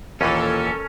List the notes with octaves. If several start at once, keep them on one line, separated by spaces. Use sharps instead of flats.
D#2 A#2 E3 C#4 A4 A#4